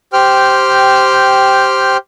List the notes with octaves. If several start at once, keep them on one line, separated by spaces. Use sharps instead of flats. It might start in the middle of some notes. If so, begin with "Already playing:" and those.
G4 C5 G5 F6